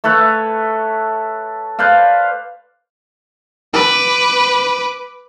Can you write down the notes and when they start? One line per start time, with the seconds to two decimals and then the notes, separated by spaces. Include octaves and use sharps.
0.04 A3 A4 B4 C#5
1.79 B4 C5 D5 F5
3.74 B4 D6